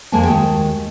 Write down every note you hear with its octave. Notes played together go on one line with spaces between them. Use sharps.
F2 G#3 A#3 A#4 G#5 A5
D#2 G#3 F#4 G5